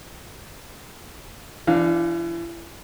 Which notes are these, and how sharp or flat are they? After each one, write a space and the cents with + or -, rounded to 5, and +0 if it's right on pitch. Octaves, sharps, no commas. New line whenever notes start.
E3 +40 D4 +0 F5 +0